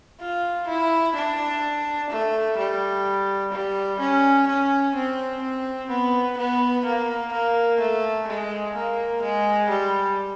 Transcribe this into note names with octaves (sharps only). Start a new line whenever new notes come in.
F4
E4
D4
A3
G3
G3
C#4
C#4
C4
C4
B3
B3
A#3
A#3
A3
G#3
A#3
G#3
G3